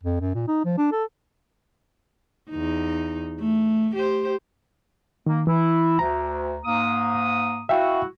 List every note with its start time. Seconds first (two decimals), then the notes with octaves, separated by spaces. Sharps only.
0.03 F2
0.21 F#2
0.34 A#2
0.48 D#4
0.65 F3
0.78 D4
0.92 A4
2.50 E2 D#4
3.39 A3
3.94 G4 C5
5.26 D#3 A#3
5.47 E3 E4
5.99 D2 A#5
6.64 G#2 A#3 D#6
7.69 E4 F#4 E5 F5 G5